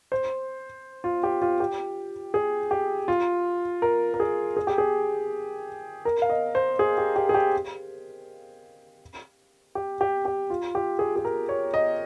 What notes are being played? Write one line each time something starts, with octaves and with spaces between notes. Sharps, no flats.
C5
F4
G4
F4
G4
G#4
G4
F4
A#4
A#4
G#4
G#4
G4
G#4
A#4
F5
D#5
C5
G#4
G4
G4
G#4
G4
G4
G4
G4
F4
G4
G#4
G#4
A#4
C#5
D#5